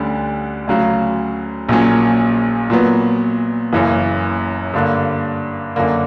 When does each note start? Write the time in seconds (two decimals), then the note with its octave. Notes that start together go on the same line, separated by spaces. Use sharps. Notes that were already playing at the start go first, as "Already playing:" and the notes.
Already playing: D2 D3 G3 C#4
0.67 D2 C#3 F#3
1.69 A#1 A#2 F#3 C#4
2.70 A#2 F#3 B3
3.73 F#1 F#2 C#3 E3
4.74 G2 D3 A#3
5.76 F#2 D3 A#3